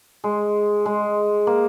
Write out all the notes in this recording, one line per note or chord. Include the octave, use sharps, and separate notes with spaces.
G#3
G#3
A#3